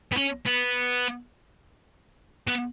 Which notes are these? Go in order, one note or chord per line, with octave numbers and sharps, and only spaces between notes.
B3
C#4
B3
B3